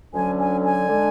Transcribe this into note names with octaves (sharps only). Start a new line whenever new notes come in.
D2 D3 F#3 C#4 G#5
G#5
G#5
D3 G#3 D4